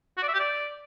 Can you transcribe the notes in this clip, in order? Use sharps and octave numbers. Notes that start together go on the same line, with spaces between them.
F#4
D5
E5
G4
D5